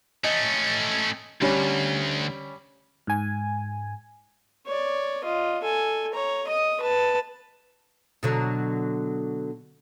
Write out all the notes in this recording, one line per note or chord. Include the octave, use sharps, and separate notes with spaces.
A3 C#4 D#5
D2 G3 C#4
G#2 G#5
C#5 D5
F4 D#5
A4 G#5
C#5 A#5
D#5 D#6
B4 A5
B2 D3 F#3